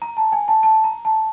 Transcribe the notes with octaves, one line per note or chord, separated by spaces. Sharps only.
A#5
A5
G#5
A5
A5
A#5
A5